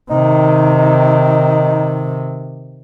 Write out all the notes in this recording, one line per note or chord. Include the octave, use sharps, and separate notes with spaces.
C3 D#3 D#4